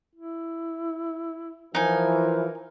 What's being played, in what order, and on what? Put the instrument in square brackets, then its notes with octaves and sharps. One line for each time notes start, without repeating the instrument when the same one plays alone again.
[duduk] E4
[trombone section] E3 F3 [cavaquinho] D#4 G#5 [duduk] A#4